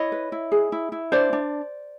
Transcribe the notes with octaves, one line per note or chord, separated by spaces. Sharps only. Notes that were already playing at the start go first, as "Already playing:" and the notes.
Already playing: E4 C#5 D#5
B4
E4
G#4
E4
E4
D4 C5 D5
D4